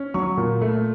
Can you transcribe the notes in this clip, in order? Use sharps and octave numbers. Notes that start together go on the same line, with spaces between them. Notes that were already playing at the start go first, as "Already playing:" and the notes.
Already playing: C#4
F#3 C#6
A#2
A3